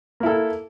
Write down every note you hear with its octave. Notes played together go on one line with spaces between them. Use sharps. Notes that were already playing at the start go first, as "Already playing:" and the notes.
A#3 E4 A4